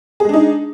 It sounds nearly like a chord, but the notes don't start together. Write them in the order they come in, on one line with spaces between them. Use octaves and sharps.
G#4 G#3 D4 D#4